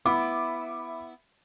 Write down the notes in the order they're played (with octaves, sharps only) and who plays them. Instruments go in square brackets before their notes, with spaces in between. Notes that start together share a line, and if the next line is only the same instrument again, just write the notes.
[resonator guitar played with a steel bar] B3 E4 [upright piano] E5 B5 D6